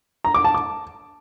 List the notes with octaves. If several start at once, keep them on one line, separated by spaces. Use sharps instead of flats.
A#5
D6
A5
D6